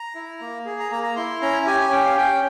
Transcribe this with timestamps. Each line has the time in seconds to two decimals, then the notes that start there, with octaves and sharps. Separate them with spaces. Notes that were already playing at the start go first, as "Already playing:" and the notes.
Already playing: A#5
0.15 E4
0.41 A#3
0.66 G#4
0.79 A#5
0.91 A#3 A#5
1.03 A#5
1.16 E4 C6
1.42 C#4 A#5
1.66 G4 G#5
1.80 G#5
1.92 C#4 G5
2.05 F5
2.17 C#4 G5